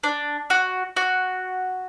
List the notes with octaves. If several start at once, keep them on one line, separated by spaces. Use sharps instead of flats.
D4
F#4
F#4